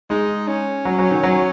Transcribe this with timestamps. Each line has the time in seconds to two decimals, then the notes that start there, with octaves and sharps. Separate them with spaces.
0.10 G#3 D#4
0.48 C#4
0.85 F#3
0.99 F#3
1.11 D#3
1.23 F#3